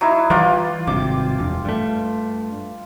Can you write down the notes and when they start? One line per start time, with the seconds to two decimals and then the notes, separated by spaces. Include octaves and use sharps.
0.01 F#3 D#4 E4
0.30 E3 G3 F4 D5 G5
0.87 G#1 G2 C3 D6
1.38 E1
1.65 G2 A3